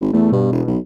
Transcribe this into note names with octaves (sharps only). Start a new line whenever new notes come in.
G#1
E2 A3
G2 B2
E1
B1